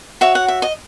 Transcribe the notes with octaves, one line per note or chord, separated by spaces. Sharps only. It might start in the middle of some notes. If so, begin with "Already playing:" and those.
F#4 C#5 E5
F#5
E5
D#5